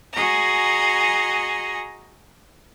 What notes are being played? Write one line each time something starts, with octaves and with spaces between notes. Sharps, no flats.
F#4 G#4 D#5 G#5 A#5